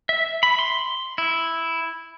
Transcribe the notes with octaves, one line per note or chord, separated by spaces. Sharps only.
E5
B5
C6
E4